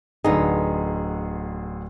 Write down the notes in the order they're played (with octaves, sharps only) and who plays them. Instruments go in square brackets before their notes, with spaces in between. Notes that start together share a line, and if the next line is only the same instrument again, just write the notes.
[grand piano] D1 D3 G#4 [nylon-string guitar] B3 D#4